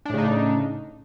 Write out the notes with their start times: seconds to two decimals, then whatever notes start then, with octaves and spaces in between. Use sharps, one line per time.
0.05 D4
0.10 A2
0.14 C#3
0.18 D#4